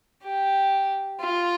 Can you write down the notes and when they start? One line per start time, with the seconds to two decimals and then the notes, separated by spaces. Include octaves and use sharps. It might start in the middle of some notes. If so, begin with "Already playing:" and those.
0.23 G4
1.21 F4